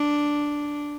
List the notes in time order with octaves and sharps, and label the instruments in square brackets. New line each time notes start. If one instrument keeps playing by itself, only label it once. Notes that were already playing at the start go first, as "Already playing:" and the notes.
Already playing: [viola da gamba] D4